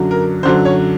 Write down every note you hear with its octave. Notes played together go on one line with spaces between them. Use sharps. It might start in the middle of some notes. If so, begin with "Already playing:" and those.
Already playing: F#2 D3 F#3
A#4
F#2 D3 F#3 C5
C#5